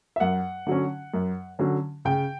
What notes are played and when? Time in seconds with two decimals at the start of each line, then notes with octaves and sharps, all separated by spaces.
0.16 E5
0.20 F#2 F#5
0.67 D3 F#3 C#4
1.14 F#2
1.59 D3 F#3 C#4
2.05 C#3 G5